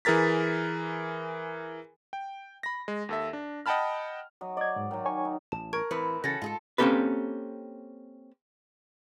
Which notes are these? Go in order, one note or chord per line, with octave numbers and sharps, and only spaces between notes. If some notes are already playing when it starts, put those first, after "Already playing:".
E3 G#4 A#4 A6 B6
G5
B5 A#6
G#3
D#2 A4 E5
D4
D#5 F#5 G5 A5 B5 F6
F#3 D#5
D5 D#5 G#6
G#2
D#3 F#3
C#5 G#5 C#6
D#4
A1 A5
A#4 C#6 G#6 D7
A2 E3 C4 B4
C#3 E3 C#4 F#4 A4 A6 A#6
G#2 G#3 F4 G#4 A4
A#3 C4 C#4 G4 A4 B4